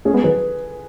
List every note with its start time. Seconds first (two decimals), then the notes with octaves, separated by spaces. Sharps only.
0.05 A3 C#4 G#4
0.14 G#3 B3
0.24 D#3 F#3 B4